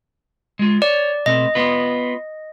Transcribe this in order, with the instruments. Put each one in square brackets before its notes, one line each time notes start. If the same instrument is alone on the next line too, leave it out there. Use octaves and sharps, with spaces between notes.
[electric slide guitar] G#3 F4
[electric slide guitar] C#5 [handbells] D5
[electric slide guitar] B2 A3 C4 [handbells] D#5
[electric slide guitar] B3 F4 B4